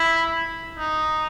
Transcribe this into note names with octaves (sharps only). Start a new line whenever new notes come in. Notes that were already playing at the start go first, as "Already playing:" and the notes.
Already playing: E4
D#4